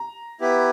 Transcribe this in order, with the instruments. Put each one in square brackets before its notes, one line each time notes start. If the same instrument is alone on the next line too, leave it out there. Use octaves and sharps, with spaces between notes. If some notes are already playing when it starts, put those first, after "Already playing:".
Already playing: [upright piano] A#5
[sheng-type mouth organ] B3 E4 G4 B4